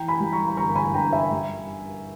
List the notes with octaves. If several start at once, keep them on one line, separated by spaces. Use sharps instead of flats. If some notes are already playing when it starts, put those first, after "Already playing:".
Already playing: E3 G5 A#5
G#5 B5
G3
A#5 C#6
B5
G1 A#5 C#6
G#5 B5
G2 G5 A#5
E5 G#5
G3